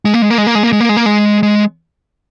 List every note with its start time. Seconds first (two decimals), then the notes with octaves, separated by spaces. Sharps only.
0.05 G#3
0.14 A#3
0.22 G#3
0.30 A#3
0.38 G#3
0.47 A#3
0.55 G#3
0.63 A#3
0.73 G#3
0.81 A#3
0.89 G#3
0.97 A#3
1.06 G#3
1.43 G#3